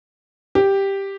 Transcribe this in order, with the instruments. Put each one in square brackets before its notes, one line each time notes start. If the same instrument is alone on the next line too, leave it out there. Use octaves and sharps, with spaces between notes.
[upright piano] G4